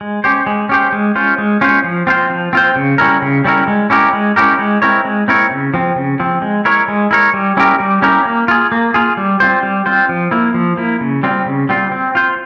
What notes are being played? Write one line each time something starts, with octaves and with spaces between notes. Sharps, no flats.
G#3
C#4 G4 C5
G#3
C#4 G4 C5
G#3
C#4 F4 C5
G#3
C#4 F4 C5
F3
C4 F4 C5
F3
C4 F4 C5
C#3
G3 C#4 E4 A#4
C#3
G3 C#4 E4 A#4
G#3
C#4 E4 G4 A#4
G#3
C#4 E4 G4 A#4
G#3
C4 E4 A#4 C#5
G#3
C4 E4 A#4 C#5
C#3
F3 C4
C#3
F3 C4
G#3
E4 A#4 C#5
G#3
E4 A#4 C#5
G3
C#4 E4 G4 A#4
G3
C#4 E4 G4 A#4
A#3
F4 G#4
A#3
F4 G#4
G3
C4 F4 C5
G3
C4 F4 C5
F3
A#3 E4
F3
A#3 E4
C#3
G3 C4 F4
C#3
G3 C4 F4
C4
F4 C5